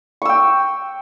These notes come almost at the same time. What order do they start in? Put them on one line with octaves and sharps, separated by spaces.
C#6 E6 G5